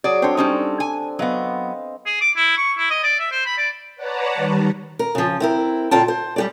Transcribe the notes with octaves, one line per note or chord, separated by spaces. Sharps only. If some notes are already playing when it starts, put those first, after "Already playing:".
F#3 G#4 D5
C4 D4 A4 C5 C#5
G3 C#4 D#4 C6
G#5
F#3 B3 C5 D#5 F5
G#4
D6
E4
C#6
E4
D#5
D5
E5
C5
B5
D5
B4 C#5 D5 F#5 A5 A#5
D#3 G3
A#4
C#3 F3
C4 E4 A#4
A#2 D3 F4 G5 A5
C5
G3 G4 D5